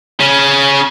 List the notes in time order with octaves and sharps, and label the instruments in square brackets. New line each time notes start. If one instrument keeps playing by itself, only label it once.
[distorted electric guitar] C#3 C#4